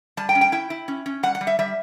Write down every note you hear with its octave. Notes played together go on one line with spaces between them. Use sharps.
G3 A5
G5
C#4
G5
E4 G5
E4
C#4
C#4
G3 F#5
F#5
G3
E5
G3 E5